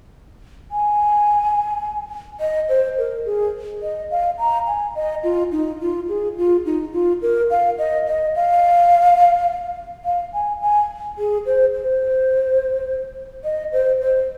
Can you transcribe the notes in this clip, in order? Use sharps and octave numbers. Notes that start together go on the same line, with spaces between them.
G#5
D#5
C5
A#4
G#4
D#5
F5
A#5
G#5
D#5
F4
D#4
F4
G#4
F4
D#4
F4
A#4
F5
D#5
D#5
F5
F5
G#5
G#5
G#4
C5
C5
D#5
C5
C5